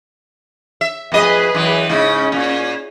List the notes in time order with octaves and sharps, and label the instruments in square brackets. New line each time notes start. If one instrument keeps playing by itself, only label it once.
[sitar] E5
[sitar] F2 D#5 [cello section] G#4 B4
[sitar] F#2 E3
[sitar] G#2 C#3 E4 [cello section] C#4
[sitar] A#2